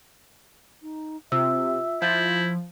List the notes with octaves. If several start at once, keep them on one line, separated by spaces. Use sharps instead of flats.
D#4
C3 F4 E5 E6
F3 E4 G6 A6